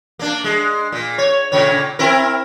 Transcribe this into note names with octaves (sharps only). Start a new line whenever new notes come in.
A#3 D4
G#3
A#2
C#5
A#2 C#3 C#5
C4 E4 A#4